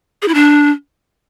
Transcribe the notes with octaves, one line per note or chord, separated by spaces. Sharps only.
G#4
E4
D4